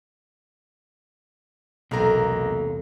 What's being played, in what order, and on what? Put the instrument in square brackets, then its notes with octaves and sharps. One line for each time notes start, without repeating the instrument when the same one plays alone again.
[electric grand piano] B1 A#5 [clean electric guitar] E2 G2 C3 [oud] A#3 A4 A#4